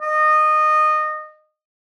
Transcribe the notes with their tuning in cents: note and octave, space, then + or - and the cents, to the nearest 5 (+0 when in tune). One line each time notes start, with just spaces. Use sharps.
D#5 -20